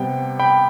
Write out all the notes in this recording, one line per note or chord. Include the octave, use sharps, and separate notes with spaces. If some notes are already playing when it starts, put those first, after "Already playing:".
Already playing: C3 G3 B3 G5
G5 B5